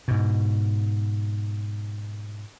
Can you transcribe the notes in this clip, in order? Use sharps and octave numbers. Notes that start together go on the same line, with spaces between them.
G#2 B2